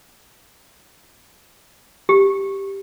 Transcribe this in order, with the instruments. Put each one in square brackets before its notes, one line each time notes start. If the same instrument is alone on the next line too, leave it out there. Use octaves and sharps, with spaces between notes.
[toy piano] G4